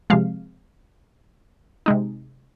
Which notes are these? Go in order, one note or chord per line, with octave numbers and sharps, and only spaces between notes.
C3 F3 G#3 F5
C3 G#3 D#4